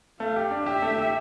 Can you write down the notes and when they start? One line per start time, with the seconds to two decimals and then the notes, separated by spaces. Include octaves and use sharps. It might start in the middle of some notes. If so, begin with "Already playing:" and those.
0.20 A3 F5
0.36 G4
0.51 D4
0.66 G4 E5
0.82 A3
0.98 G4